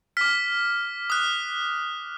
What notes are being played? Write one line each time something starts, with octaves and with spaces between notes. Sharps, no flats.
D6 F6 B6
D#6 F#6